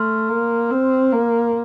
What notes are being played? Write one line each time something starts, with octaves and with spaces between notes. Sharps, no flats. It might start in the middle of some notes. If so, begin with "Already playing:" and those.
Already playing: A3 C6 F6
A#3
C4
A#3